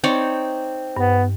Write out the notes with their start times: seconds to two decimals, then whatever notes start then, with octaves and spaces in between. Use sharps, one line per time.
0.04 C4 D#4 C#5 D5
0.96 G2 B3